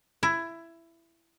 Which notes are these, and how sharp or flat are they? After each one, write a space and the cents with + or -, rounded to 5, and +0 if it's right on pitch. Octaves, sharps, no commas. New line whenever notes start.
E4 +15